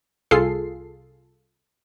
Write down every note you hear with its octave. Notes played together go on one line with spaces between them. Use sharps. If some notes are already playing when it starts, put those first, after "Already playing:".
C2 F4 G#4 A4 C7